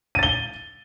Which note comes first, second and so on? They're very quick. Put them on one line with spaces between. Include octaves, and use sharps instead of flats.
D#7 A6 G7